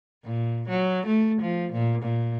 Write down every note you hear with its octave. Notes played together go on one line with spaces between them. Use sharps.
A#2
F#3
A3
F3
A#2
A#2